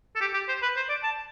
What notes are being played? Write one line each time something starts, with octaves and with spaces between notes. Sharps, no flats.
A4
G4
G4
C5
B4
C5
D5
A5